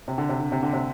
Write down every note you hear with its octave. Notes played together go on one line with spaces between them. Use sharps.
C3
D3
C3
D3
C3
D3
C3